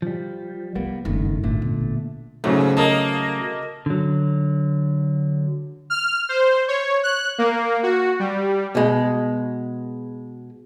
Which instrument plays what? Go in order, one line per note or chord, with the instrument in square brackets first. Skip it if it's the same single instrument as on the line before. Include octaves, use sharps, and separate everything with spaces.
[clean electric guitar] F3 G3
[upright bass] C2 [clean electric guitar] G3 A#3 B3
[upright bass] F#1 [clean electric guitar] G2 D#3 A3
[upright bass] G#1 [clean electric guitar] A#2 D3 A3
[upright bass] B2
[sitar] G#2 [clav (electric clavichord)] C#3 F#3 A3
[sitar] A#3 [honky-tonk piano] A#4 D#5 A5
[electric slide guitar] D3 F#3
[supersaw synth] F6
C5
C#5
F#6
A#3
F#4
G3
[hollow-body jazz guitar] B2 G#3